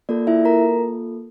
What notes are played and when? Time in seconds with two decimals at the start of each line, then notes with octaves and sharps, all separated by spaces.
0.09 A#3 F4 A4 D5
0.27 E4 E5
0.45 A#4 A#5